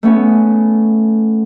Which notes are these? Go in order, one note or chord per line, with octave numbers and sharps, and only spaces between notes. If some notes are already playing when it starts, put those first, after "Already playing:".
A3 B3 C#4 G#4